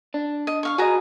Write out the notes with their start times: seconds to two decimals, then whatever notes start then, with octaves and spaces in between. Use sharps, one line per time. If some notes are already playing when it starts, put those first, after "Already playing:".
0.14 D4
0.47 D#5
0.63 C#5 F5 C#6
0.78 F#4 G#4 D#5 A#5